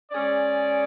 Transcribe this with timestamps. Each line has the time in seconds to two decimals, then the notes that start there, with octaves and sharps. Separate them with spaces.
0.12 G#3 C#4 G#4 D5